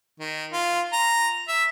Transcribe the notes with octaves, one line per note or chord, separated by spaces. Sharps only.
D#3
F4
A#5
E5